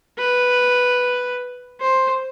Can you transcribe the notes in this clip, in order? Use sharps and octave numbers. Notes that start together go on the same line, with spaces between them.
B4
C5